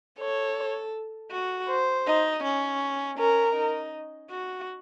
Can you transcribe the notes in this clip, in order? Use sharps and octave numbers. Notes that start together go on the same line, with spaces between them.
A4 C#5
F#4
C5
D#4
C#4
C#4 A#4
D#4
F#4